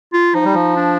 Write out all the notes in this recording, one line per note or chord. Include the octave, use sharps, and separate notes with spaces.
F4
F3 D#4
G3
F3
D4